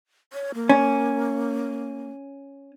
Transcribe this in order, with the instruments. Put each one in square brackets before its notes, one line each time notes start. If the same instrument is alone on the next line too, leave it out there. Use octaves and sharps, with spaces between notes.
[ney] C#5
A#3
[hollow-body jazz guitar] C#4